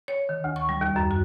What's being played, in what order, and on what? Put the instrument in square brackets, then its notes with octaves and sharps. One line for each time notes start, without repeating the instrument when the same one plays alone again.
[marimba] C#5
D#3
D2
C#6
G3
D#2
F#2
F#4